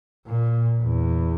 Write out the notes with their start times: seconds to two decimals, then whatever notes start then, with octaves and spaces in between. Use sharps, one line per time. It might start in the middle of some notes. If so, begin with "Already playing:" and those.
0.27 A#2
0.83 E2